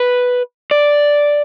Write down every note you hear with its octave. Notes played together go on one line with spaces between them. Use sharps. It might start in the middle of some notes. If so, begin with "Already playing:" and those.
Already playing: B4
D5